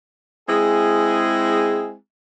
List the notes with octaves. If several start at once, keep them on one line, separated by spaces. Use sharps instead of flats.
G#3 C4 E4 G#4